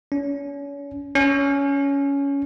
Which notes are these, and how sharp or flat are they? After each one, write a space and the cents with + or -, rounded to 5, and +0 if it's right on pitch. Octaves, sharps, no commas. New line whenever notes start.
C#4 +35
C#4 +15